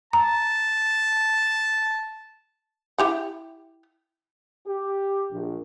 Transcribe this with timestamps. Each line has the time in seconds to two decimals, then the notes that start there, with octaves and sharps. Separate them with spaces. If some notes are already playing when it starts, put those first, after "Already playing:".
0.13 A5 A#5
2.98 E4 G4 F#5
4.67 G4
5.32 A#1